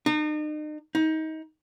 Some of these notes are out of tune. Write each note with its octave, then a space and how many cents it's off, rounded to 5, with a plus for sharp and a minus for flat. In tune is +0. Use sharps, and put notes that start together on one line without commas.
D#4 -40
D#4 +25